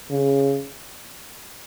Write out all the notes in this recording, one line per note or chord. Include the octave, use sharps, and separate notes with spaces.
C#3